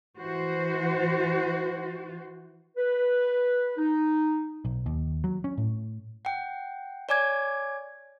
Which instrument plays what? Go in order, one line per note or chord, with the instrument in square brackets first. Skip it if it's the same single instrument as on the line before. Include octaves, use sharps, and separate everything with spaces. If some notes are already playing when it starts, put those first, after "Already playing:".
[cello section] E3 F#4 C5
[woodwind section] B4
D#4
[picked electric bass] B1
D#2
F#3
C#4
A2
[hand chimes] F#5 G5
C#5 D5 G#5 D6 G#6